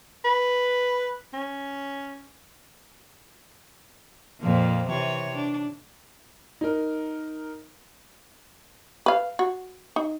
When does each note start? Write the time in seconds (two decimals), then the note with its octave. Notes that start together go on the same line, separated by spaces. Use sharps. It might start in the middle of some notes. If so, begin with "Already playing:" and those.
0.24 B4
1.33 C#4
4.41 F2 A#2 F3
4.87 C3 E3 C#5
5.35 D4
6.61 D#4 A#4
9.06 B4 F5
9.39 F#4
9.96 D#4